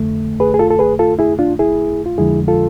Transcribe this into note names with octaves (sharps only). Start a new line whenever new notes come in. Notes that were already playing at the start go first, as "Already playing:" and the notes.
Already playing: F2 D3 A3
G#4 B4
G#4
F4 A4
A4
G#4 B4
F4 A4
E4 G#4
D4 F4
E4 G#4
F4
F2 D3 F3 G#3 E4 G#4
F4 A4